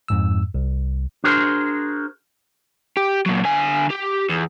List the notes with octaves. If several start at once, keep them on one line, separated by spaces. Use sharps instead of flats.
F2 G#2 E6
C2
D4 F#4 G#4 A#4 C5
G4
A#2 F#3
D3 G#5
G4
E2